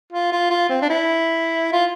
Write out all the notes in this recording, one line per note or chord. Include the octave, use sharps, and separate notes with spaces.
F4
F4
F4
C4
D4
E4
F4